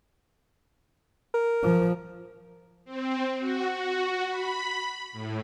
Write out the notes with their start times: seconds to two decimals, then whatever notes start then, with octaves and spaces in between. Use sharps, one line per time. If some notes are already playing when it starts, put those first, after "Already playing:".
1.34 A#4
1.63 F3
2.85 C4
3.39 F#4
3.72 F#4
4.29 B5
5.12 A2